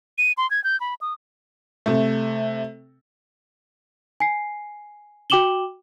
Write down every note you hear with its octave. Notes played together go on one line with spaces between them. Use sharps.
D#7
C6
G#6
G6
B5
D#6
C3 A3
G#5 C7
F#4 G5 D6 E7 F#7 G7